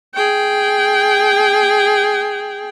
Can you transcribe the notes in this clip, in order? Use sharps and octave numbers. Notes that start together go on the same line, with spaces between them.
G#4 G5